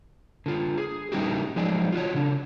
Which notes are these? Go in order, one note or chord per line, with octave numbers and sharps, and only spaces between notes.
D3 F4
G#4
G3 C#4 D#4 E4 F#4 G4
F3 F#3 G#3 D#4 G#4 D5
F4 F#4 C#5
C#3 D4